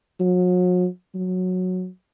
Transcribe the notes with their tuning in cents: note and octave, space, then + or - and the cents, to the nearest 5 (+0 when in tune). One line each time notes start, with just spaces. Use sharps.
F#3 -40
F#3 -10